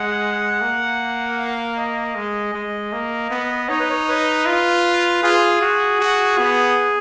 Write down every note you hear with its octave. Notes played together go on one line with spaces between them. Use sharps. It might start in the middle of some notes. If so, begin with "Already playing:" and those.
Already playing: G#3 F#5
A#3
F5
D#5
G#3
G#3
A#3
B3
D#4 C#5
B4
C#5
B4
F4
F4 G#4
F#4
F#4
B3